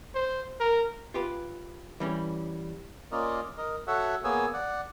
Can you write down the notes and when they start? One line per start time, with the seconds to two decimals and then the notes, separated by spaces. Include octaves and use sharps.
0.15 C5
0.60 A#4
1.14 F4 G4 B4
2.00 E3 G3 C#4
3.12 A#3 C#4 F4 A#4 D5 D#5
3.58 A#4 D#5
3.87 F#4 A4 C#5 E5 F#5
4.24 A#3 B3 G#4 C#5 G#5 E6
4.54 D5 F#5